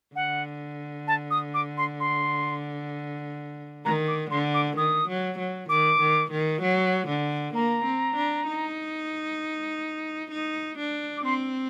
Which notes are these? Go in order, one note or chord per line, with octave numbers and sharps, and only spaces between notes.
D3 F#5
A5
D#6
D6
C6
C6
D#3 A#5
D6
D3 C6
D6
D#3 D#6
F#3
F#3
D#3 D6
D#3
D#3
F#3
D3
A#3 A#5
C4
D4
D#4
D#4
D4
D6
C4 C6